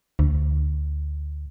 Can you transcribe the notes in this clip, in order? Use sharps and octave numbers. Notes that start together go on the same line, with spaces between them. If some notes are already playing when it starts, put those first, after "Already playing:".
D2